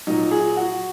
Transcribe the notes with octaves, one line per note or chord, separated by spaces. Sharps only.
A#2 F#3 D#4
G#4
F#4